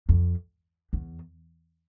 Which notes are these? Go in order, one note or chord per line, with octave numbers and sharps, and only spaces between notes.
F2
E2